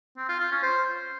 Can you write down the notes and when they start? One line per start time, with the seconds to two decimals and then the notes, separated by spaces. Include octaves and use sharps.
0.17 C4
0.28 F4
0.40 F4
0.51 C#4
0.63 C5